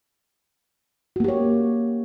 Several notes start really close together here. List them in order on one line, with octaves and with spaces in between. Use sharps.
F#4 A#3 G4 C#5